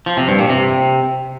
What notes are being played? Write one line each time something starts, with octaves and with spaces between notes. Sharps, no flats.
F3
C3
G2
A#2
C3